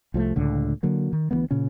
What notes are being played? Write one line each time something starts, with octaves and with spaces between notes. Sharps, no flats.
C2 F3 G3 A3
C#2 A2 D3
D3 F#3 A#3
D#3
D2 E3 G#3 B3
A#2 C#3 C#4